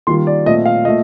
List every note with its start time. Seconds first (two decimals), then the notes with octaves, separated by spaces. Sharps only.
0.07 D#3 G3 A#3 F4 C6
0.27 D5
0.46 A#2 A3 C4 D#5
0.66 F5
0.85 A#2 A3 D#5